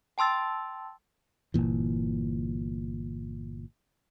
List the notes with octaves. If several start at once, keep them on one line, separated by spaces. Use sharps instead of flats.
G5 A5 C6 E6 A6
G1 C#2 A#2 E3